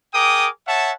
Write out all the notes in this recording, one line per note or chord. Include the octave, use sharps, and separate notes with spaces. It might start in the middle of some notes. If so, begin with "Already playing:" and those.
G#4 A#4 G5 D6 D#6
C#5 E5 F#5 A5